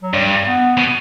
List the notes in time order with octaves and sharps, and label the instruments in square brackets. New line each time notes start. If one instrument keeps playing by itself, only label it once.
[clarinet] F#3
[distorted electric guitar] G2 [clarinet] G3
[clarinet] B3
[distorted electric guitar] B2